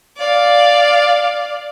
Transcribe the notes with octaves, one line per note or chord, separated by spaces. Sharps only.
D5 F5